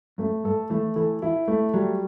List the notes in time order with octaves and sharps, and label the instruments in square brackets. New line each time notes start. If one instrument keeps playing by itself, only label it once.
[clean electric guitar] F#2 [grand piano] A3
[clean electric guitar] G2 [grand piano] A4
[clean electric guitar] E3 [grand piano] A3
[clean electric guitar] E3 [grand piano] A4
[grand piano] E4
A3
[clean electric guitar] F#3 [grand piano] G3